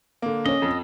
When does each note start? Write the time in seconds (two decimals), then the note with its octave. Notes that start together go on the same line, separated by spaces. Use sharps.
0.22 D3 A#3
0.46 C#4 C#5 D#5
0.62 F2